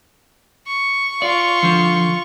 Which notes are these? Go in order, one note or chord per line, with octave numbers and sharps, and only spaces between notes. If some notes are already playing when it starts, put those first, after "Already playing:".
C#6
F4 D5
D3 F3